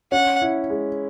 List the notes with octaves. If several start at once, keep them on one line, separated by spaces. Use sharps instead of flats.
C#4 F#5
E4
G#3